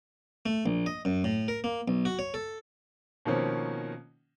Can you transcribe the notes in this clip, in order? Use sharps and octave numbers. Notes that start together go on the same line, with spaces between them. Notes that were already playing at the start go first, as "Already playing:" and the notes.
A3
A#1
D#5
F#2
A2
A#4
A#3
B1
F#4
C#5
A4
B2 D#3 F3 A#3 C4 C#4